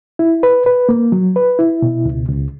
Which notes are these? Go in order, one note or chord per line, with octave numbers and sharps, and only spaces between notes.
E4
B4
B4
A#3
F#3
B4
E4
B2
C#2
C#2